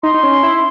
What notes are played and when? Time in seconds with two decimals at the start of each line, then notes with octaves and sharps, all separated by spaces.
0.03 D#4 C6
0.14 D#4
0.23 C#4
0.43 E4